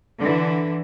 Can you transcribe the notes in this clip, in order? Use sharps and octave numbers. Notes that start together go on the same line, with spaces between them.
D3 E3